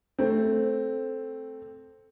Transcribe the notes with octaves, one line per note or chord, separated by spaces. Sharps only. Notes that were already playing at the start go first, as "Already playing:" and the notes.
A3 C4